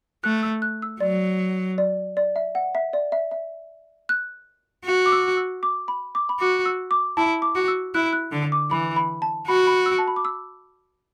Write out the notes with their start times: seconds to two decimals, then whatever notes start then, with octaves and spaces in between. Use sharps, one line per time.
0.24 A3 F#6
0.43 E6
0.62 F#6
0.82 E6
1.00 F#3 D5
1.78 D5
2.17 D5
2.36 E5
2.55 F#5
2.75 E5
2.93 D5
3.12 E5
3.31 E5
4.09 F#6
4.86 F#4
5.06 D6
5.12 E6
5.37 E6
5.63 D6
5.88 B5
6.15 D6
6.29 B5
6.40 F#4 D6
6.66 E6
6.91 D6
7.17 E4 A5
7.42 D6
7.55 F#4
7.68 E6
7.94 E4 F#6
8.13 F#6
8.32 D3
8.52 D6
8.71 E3 B5
8.96 B5
9.22 A5
9.48 F#4 B5
9.67 B5
9.86 E6
9.99 A5
10.08 B5
10.16 D6
10.25 E6